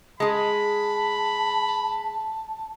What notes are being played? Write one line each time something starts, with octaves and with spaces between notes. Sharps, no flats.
G#3 G#4 A5 B5